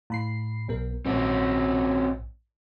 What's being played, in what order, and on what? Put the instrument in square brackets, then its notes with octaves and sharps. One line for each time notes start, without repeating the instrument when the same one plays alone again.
[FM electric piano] A2 B5 C7
B1 B3 A#4
[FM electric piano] A#1 G#2 [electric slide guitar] C4 C#4 F#4